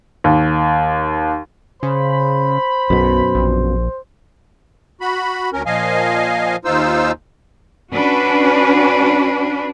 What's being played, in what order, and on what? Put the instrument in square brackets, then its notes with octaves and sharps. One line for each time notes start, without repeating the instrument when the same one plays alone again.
[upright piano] D#2
[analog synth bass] C#3 [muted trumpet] C5 [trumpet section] B5
[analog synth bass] B1 [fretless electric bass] F#2 B2
[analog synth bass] A#1
[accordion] F#4 B5
D2 C#4 A#4
A#2 F3 D#5 F5 G#5
D#2 D#4 F4 C5 E6
[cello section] C#4 D4 F#4 B4